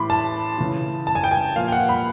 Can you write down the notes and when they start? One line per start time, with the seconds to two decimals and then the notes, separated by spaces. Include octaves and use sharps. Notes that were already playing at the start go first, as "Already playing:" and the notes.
Already playing: A2 E3 B5 C6 D6
0.10 A5
0.58 C#3 E3
1.07 A5
1.15 G#5
1.24 G5
1.31 G#5
1.56 A#2 F3 F5
1.68 G5
1.72 F#5
1.89 B5